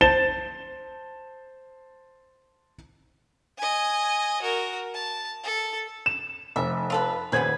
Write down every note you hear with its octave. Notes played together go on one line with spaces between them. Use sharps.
C5 A5 A6 E7 G7
D#5 G#5
F#4 A#4
A5
A4
E7
F1 E5
F4 A4 B4
D#1 B3 G#4 B4 C5 G#6